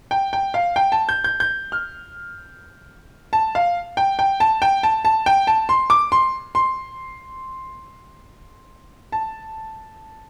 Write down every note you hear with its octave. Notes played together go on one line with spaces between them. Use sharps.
G5
G5
F5
G5
A5
G6
G6
G6
F6
A5
F5
G5
G5
A5
G5
A5
A5
G5
A5
C6
D6
C6
C6
A5